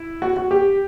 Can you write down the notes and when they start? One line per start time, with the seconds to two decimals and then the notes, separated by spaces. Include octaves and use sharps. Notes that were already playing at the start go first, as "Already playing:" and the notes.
Already playing: E4
0.22 F#4
0.37 F#4
0.51 G4